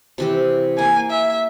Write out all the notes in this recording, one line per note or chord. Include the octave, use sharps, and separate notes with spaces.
C3 E3 G4
A#3 G#5
E5